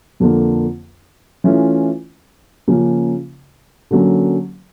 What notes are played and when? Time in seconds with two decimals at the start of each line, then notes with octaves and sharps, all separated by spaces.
0.20 F2 D3 F3 A#3
1.44 E3 A3 C#4 F4
2.68 C#3 F3 A#3 C#4
3.91 D3 F#3 A#3 C#4